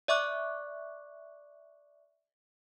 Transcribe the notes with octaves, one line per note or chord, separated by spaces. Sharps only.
D5 E5 C#6 D6 F#6